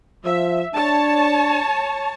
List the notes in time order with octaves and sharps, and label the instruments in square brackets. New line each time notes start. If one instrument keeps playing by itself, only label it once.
[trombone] F3 [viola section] E5
[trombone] D4 [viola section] C#5 A5